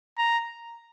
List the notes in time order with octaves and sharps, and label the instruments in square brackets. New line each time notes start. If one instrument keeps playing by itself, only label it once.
[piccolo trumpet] A#5